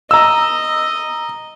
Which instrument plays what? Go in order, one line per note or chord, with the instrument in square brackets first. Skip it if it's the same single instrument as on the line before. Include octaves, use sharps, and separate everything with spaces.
[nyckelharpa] D#5 [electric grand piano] A#5 E6